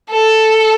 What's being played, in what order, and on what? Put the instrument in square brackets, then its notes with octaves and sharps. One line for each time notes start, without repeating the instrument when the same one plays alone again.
[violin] A4